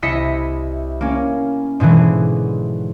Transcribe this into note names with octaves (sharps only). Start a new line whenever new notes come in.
C2 E4 D#5 E5 B6 C#7
A#3 C#4
G#2 B2 D3 E3 F#3